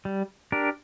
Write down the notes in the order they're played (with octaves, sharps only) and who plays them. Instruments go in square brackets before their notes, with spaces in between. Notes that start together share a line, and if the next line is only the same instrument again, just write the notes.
[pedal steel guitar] G3
D4 G4 A#4